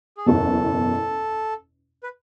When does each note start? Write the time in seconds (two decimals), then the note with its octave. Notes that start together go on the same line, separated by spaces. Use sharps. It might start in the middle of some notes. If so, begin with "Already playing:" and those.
0.17 G#4
0.26 F#1 E2 B2 A4
2.03 B4